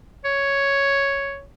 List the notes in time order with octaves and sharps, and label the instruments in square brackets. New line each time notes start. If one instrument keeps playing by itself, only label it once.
[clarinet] C#5